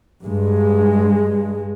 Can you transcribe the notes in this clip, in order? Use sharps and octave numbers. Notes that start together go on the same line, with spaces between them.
G2 G#3